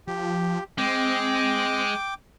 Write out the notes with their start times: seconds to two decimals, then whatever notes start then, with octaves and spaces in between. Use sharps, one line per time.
0.07 F3 G4
0.78 G#3 C4 G5 D6